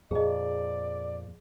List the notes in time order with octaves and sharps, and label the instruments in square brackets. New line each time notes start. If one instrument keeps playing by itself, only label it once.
[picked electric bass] F2 A#2 [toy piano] G#4 D#5 [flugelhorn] D5